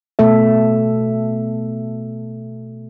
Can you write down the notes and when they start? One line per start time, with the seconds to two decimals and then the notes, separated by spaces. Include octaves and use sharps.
0.19 B2 A3 A4 E5